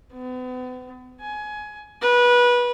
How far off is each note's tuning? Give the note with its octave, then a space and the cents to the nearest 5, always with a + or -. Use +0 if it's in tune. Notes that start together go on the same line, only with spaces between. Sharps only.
B3 +40
G#5 +20
B4 -25